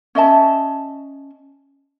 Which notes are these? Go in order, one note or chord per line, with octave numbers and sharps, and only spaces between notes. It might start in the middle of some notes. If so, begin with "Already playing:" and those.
C#4 D#5 E5 A5